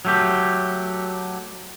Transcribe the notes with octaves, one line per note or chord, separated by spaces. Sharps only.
F#3 A3 G4